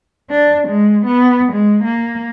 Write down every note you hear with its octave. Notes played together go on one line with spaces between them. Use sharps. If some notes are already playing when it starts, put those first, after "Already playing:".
D4
G#3
B3
G#3
A#3